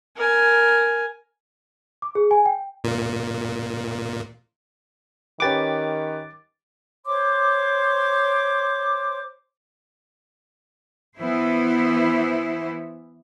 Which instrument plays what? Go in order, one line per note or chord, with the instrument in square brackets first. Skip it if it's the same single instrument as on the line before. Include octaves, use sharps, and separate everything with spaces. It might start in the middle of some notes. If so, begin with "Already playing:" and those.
[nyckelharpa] A#4 G#5
[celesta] D6
G#4
G#5
G5
[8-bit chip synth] A#2
[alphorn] D#3 [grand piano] C#4 G4 B4 [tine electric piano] D6 A6
[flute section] C5 C#5 C6 D6
[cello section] E3 B3 E4 C5